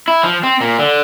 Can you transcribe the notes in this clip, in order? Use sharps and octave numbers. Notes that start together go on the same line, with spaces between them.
E4
F3
C4
A#2
D3